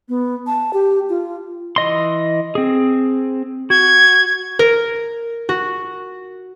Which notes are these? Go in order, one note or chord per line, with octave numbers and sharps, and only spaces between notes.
B3
A5
G4
F4
E3 D#5 C6
C4 G#4
F#4 G#6
A#4
F#4